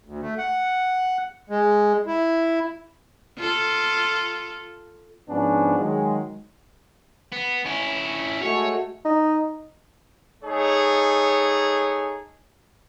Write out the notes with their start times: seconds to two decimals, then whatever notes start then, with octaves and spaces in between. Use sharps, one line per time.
0.04 D2
0.21 A3
0.38 F#5
1.50 G#3
2.07 E4
3.37 F4 A4
5.29 G#2 F3 B3 C#4 D4
5.79 D#3 F#3 G#3
7.32 B3
7.65 C#4 E4
8.42 G#3 A3 F#4 C#5
9.05 D#4
10.43 A3 D#4 G#4 C#5